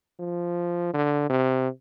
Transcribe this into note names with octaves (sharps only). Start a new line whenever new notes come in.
F3
D3
C3